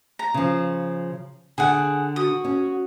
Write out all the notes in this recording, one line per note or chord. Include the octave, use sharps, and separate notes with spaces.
A#5
C#3 F3
D3 G#4 F#5
F#4 D#6
C#4